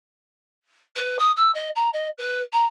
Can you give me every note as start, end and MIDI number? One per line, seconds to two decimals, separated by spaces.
0.96 1.16 71
1.19 1.31 87
1.36 1.51 88
1.54 1.69 75
1.75 1.89 82
1.93 2.08 75
2.18 2.40 71
2.52 2.65 82